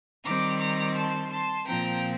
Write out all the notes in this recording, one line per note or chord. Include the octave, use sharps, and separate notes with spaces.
D#3 G3 C4 A#5 D6
A#5 D6
A5 C6
A5 C6
A#2 F3 C4 G5 A#5